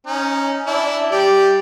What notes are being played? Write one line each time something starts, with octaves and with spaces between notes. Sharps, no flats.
C#4 D#4
D4 E4
G3 G4 D5